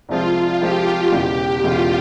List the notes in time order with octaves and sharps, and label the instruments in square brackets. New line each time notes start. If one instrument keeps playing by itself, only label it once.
[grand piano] C2 C3 F3 G#3 C4 [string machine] F4
[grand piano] C2 C3 F3 G#3 C4 [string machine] G4
[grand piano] E1 E2 C#3 E3 G#3
[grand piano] E1 E2 C#3 E3 G#3 [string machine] F4